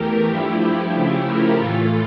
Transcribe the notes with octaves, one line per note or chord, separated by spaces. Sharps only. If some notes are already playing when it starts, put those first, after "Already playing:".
Already playing: E2 E3 A3 G4 A#4
G2 F3 A3 E4 G4
C#3 F3 A3
G4 A#4
A2 E3 A3 F4 A4